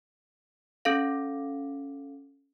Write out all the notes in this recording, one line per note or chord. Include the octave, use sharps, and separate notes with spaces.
C#4 A4 F5